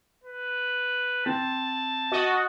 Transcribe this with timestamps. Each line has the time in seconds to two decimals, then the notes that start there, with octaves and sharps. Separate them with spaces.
0.24 B4
1.26 C4 A5
2.11 F#4 D#5